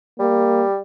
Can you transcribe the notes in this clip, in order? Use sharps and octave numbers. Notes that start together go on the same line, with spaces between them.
G3 A#3